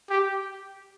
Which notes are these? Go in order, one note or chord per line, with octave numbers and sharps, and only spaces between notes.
G4